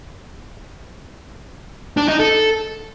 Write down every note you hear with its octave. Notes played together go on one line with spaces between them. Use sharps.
D4
D#4
A4